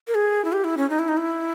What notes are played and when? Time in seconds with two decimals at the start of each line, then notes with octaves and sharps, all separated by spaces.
0.08 A#4
0.15 G#4
0.45 E4
0.53 G4
0.64 E4
0.77 C#4
0.90 D#4
0.99 E4
1.08 D#4
1.17 E4